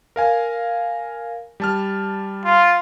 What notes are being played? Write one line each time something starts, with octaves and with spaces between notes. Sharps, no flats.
A#4 F5 G#5
G3 A5 F6
F4